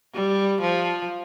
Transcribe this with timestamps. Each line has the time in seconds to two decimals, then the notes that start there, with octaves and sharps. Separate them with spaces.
0.14 G3
0.62 F3